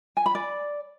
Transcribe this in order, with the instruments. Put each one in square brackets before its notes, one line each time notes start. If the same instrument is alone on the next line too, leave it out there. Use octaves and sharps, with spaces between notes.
[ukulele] G#5
B5
D5